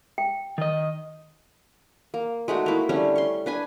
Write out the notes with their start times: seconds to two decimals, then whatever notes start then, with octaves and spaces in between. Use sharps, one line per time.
0.18 G5
0.58 D#3 D#5
2.14 A#3
2.48 G#3 A3 D#4 F#4
2.66 A#3 E4
2.89 D3 G3 A3 C#4
3.16 C6 C#6
3.46 D4 B4 G#5